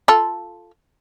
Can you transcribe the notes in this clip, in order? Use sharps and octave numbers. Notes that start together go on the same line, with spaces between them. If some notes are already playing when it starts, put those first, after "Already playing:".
F4 A4